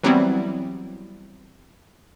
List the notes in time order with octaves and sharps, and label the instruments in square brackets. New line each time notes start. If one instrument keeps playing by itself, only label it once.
[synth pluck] E3 F#3 G3 B3 C4 E4